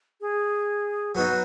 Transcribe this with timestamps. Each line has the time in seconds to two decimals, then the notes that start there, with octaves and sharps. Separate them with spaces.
0.21 G#4
1.15 F#3 B3 D#4 F#4